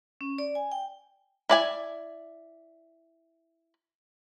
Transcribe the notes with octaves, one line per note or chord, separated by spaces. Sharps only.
C#4
D5
G#5
G5
E4 D5 G#5